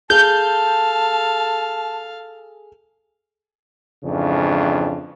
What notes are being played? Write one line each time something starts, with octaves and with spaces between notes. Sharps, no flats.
G#4 A4 F5 A5 G6
F2 G#2 C#3 E3 D4